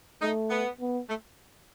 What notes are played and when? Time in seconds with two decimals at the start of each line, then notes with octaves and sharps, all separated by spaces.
0.21 A3 D#4
0.50 B3
0.80 B3
1.09 A3